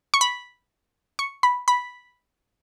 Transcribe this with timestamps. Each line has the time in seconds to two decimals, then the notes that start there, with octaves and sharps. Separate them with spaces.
0.14 C#6
0.21 B5
1.19 C#6
1.43 B5
1.68 B5